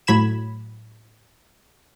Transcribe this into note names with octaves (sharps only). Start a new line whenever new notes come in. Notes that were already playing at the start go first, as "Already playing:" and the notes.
A2 F#3 B5 G#6 E7